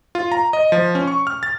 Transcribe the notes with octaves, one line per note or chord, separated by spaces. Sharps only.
F4
A#5
D#5
F3
C#4
C#6
F6
A6